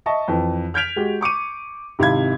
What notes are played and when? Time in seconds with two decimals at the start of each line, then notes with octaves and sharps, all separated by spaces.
0.06 D#5 E5 A5 C#6
0.28 F2 E3
0.74 F6 G6 G#6 B6 D7 F7
0.96 G#3 F#4 G4
1.21 C#6 D6 C#7 D#7
1.99 G#1 C3 E4 F5 B5 G#6